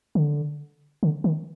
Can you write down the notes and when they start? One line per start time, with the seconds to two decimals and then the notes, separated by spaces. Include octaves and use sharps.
0.15 D3
1.03 D3
1.24 D#3